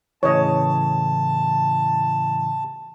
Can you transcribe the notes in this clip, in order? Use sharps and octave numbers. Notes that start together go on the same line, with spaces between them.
A2 C#3 E3 C#5 D#5 A5